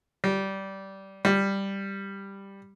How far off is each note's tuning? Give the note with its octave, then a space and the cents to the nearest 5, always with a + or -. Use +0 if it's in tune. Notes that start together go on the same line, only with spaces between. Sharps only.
G3 -15
G3 +5